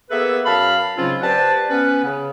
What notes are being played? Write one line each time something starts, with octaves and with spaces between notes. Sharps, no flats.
A#3 B3 G#4 A4 B4 E5
F#2 F5 A5 B5
G#2 C#3 F#3 C4 C#4 F4
G4 B4 C5 D5 F#5 A5
B3 C#4 B4
C#3